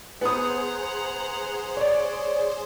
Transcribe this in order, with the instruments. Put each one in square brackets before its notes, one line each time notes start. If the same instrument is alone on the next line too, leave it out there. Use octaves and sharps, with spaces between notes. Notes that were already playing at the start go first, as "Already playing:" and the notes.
[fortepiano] B3 D#6 [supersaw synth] G#4 C5 [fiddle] F#5 A#5
[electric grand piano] C#5 D5